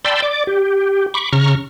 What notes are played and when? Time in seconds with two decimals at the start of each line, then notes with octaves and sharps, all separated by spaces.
0.05 D5 G5 A5 B5 C6 E6
0.22 D5 D6
0.47 G4
1.14 B5 C#6 D6
1.33 C#3 A#5 C#6 F6